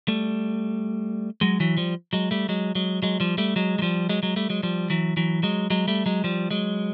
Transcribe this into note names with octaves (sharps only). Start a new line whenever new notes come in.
G3 A3
F#3 G#3
E3 F#3
F3 G3
F#3 G#3
G3 A3
F#3 G#3
F#3 G#3
F#3 G#3
F3 G3
G3 A3
F#3 G#3
F#3
F3 G3
F#3 G#3
F#3 G#3
G3 A3
F#3 G#3
F3 G3
E3 F#3
E3 F#3
F#3 G#3
F#3 G#3
G3 A3
F#3 G#3
F3 G3
F#3 G#3